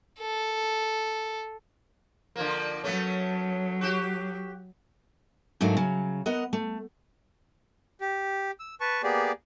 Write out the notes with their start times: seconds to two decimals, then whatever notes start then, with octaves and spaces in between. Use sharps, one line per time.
0.19 A4
2.36 D3 F3 A#3
2.84 F#3 A3 B3 C#4
3.81 F#4 G4
5.61 G#2 F#3 A3 A#3 D4
5.77 C#3 F#3
6.26 B3 A#4 D#5 F#5
6.53 A3
8.01 G4
8.60 E6
8.81 B4 A5 C#6
9.03 A#3 B3 G4 G#4 D5